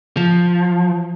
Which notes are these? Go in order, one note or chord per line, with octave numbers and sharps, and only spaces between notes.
F3